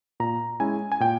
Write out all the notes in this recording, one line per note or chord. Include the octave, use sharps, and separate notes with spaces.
A#2 A#5
G#3 C#4 E4 G#5
G#5
A#2 G5